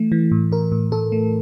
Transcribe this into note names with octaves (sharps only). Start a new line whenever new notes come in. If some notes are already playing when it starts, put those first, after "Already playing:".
Already playing: E3 A3
E3
A2
A2 A#4
A2
A2 A4
A3